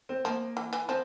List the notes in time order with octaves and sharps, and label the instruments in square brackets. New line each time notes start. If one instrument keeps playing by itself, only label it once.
[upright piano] C4
[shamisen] F3 [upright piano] A#3
[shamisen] E3
E3
[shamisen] F3 [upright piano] C4